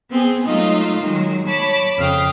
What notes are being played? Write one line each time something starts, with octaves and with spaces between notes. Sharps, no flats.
B3 C4 G#4
F#3 G#3 A3 D#4 F4
D#3 F#3 G#3
C#5 A5 B5 D6
F2 C#3 F5 G5 D#6